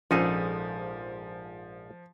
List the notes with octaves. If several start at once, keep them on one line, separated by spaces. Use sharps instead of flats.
A#1 G#2 F3 C#4 D#4 G#4 A4